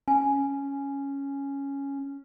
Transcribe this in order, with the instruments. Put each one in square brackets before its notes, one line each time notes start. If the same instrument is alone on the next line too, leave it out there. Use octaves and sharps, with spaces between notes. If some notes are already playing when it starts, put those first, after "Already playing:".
[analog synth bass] C#4 [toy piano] G#5